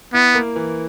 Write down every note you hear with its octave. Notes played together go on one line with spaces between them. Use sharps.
B3 E4
A#3
E3